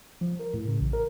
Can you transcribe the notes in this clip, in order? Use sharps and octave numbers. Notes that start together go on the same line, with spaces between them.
F3
A#4
A2
C#3
A1
A#4